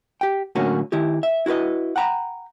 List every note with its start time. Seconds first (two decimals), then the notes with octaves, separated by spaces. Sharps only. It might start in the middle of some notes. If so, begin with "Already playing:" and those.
0.21 G4 G5
0.55 A2 D3 F#3 A#3 C#4 F#4
0.92 D#3 E4 G4
1.23 E5
1.46 E4 F#4 A#4 B4 D#5
1.96 F#5 G5 A#5 B5